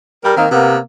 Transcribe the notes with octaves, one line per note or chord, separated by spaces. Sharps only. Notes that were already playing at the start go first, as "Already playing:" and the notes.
G3 A#4
D#3 A#3 C4 D#4
C3 A#3 B3